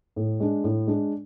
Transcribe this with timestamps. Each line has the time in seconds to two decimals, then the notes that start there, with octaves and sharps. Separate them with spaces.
0.16 A2
0.40 G#3 D4
0.64 A2
0.87 G#3 D4